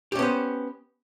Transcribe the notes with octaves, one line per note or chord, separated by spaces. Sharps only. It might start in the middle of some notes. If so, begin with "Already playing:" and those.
B3 C#4 G4 C5